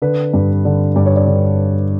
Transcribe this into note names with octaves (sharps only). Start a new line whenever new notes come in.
D3 B4
G2
D3
G2 D5
C#5
D5
D3